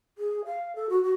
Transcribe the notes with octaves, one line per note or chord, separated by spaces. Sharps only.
G#4
F5
A4
F#4
F#4